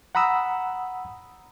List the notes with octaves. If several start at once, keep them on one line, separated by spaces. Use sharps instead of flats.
F#5 A#5 B5 D#6 E6